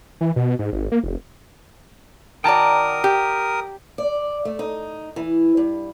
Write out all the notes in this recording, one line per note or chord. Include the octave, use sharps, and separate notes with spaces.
E3
B2
G#2
G#1
A#3
F1
D#3 F#4 A#4 D5 G5 A5 A#5 D#6
G4
D5
A3
D#4
E3
G2